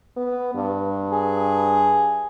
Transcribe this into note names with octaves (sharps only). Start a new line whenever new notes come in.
B3
G2
G#4